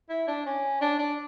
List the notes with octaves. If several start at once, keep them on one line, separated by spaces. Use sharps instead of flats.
E4
D4
C#4
D4
D4